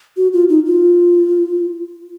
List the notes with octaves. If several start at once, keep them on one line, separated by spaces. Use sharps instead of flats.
F#4
F4
D#4
F4